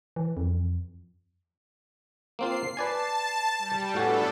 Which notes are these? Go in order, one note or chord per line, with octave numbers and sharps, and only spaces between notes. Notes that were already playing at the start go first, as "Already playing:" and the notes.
E3
F2
A#3 C4 F4 C7
B4 D5 G#5 A5
G3
A2 B3 D4 F#4 A4 G#5